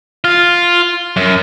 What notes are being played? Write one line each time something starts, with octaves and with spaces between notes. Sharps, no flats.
F4
F#2